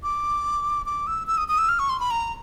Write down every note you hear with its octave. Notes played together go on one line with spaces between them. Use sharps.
D6
D6
E6
E6
D#6
D#6
E6
F6
C#6
C6
B5
A#5